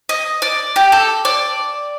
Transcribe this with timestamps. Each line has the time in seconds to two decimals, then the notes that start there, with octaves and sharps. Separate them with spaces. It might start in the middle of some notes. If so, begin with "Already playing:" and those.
0.09 D#5
0.42 D5
0.76 G4
0.92 A4
1.25 D5